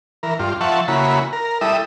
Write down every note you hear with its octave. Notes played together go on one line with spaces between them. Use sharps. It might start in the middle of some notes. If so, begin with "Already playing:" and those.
E3 A#4
G2 F4
F3 E5 F#5 A5 C#6
C#3 A#3 E4 F#4 B5
A#4
G3 E4 A4 E5 D#6